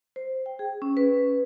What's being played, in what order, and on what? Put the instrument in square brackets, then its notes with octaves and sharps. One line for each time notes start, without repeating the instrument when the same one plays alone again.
[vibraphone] C5
G5
G#4
C#4
B4
B4